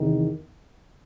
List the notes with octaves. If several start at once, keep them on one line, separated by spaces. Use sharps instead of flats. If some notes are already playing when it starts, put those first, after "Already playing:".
Already playing: E2 C3 D#3